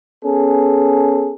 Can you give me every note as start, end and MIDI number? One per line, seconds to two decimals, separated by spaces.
0.24 1.34 59
0.24 1.34 61
0.24 1.34 68
0.24 1.34 69